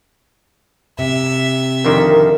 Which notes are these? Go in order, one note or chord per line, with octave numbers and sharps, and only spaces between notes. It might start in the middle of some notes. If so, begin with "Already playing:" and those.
C3 E5
F2 D3 D#3 A#4